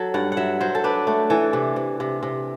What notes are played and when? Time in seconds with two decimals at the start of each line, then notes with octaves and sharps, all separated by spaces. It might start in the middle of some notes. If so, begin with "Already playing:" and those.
Already playing: F#3 A4
0.14 G2 F#5
0.32 F#5
0.37 F#3 E5
0.61 F#3 C5
0.75 A4
0.84 D4 B4
1.07 A3
1.30 E3 A4
1.53 C3
1.76 C3
2.00 C3
2.23 C3